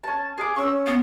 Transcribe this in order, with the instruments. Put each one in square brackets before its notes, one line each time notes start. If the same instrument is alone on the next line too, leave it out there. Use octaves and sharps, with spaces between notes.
[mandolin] C#4 A5
G#4 F5 D6
[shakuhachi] C#4 [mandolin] C#6 E6
[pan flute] B3 [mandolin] F5